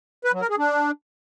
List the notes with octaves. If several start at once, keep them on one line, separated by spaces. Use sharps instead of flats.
B4
F#3
A#4
G#4
D4